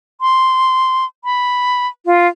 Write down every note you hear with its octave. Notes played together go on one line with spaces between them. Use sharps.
C6
B5
F4